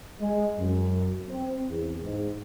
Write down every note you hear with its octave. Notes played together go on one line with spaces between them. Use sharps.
G#3
F#2
C4
E2
G#2